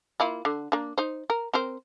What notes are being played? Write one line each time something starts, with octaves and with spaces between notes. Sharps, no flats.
A#3 E4 F4
D3
A#3 D4
D#4 C5
A#4
C4 A#4 C5